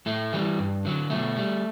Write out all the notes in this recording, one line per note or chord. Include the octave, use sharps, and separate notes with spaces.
A2 A3
E3 G3
G2
D3 F#3
B2 A3
G3